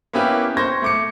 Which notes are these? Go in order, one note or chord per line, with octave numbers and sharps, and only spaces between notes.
A#3 B3 C#4 E4 G4 B4
C5 C#6 G6 G#6 A#6
A3 D6 C#7